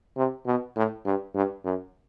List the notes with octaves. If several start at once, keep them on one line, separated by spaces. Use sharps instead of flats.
C3
B2
A2
G2
G2
F#2